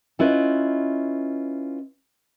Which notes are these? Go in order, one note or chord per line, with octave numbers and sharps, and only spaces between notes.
C#4 E4 F4 B4 C#5 D#5